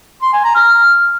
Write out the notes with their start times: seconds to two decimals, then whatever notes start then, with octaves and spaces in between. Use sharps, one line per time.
0.22 C6
0.33 G#5
0.44 A#5
0.55 F6